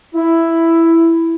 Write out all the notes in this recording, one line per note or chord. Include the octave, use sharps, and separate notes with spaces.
E4